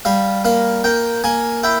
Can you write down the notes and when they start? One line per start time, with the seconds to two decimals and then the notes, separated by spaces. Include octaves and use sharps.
0.05 G3 F5
0.45 A#3 F5
0.84 A#3 G5
1.24 A#3 G#5
1.63 E4 G5